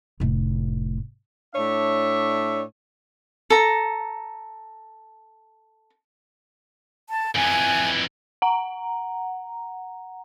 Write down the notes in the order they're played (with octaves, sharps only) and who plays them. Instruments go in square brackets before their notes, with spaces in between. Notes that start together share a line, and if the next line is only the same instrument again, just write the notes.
[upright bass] F1 A2
[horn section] A2 D4 C#5 D5 E5
[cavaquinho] A4 A#5
[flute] A5
[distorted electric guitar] F2 E3 [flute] G#5
[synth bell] F#5 A#5